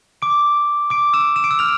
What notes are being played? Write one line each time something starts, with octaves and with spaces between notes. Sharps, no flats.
D6 D7
D6 D7
E6 E7
E7
D7
E6 E7
F6 F7